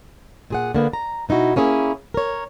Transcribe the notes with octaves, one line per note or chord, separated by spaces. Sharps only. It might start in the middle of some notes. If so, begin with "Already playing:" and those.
A#2 G#4 F#5
D3 A#3 B3
A#5
B2 D#4 E4 F#4
A#3 C#4 E4 G#4
A#4 C#5